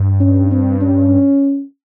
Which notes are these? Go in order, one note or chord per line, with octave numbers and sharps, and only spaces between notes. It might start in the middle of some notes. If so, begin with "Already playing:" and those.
Already playing: G2
C#4
C4
C#4